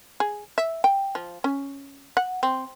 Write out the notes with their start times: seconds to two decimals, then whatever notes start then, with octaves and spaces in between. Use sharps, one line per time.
0.20 G#4
0.58 E5
0.84 G5
1.15 F3
1.44 C#4
2.17 F#5
2.43 C4